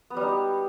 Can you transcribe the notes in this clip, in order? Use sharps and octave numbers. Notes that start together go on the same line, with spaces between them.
B3
G3
D#4
G4